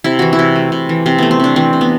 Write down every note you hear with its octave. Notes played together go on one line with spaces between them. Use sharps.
C3 E4
E3 F#4
E4
C3
A3
C3
E3
C3 C4
A3 B3
C4
C3 D4
E3 C4
C3
B3